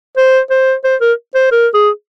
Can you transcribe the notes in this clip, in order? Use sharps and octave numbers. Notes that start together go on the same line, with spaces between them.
C5
C5
C5
A#4
C5
A#4
G#4